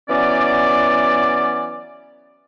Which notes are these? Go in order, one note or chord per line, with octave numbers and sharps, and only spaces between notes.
E3 F#3 B3 C#4 D5